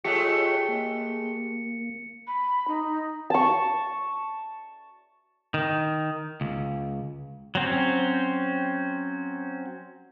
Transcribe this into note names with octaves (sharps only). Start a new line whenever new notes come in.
G#3 A3 F4 G4 C#5 C#6 C#7
A#3
B5
D#4
A5 C#6
D#3
C#2
F#3 C4 C#4